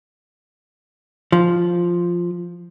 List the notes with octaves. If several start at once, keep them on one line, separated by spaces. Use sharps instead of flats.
F3